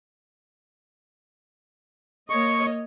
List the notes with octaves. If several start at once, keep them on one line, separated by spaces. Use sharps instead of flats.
A#3 C#5 D#5 C#6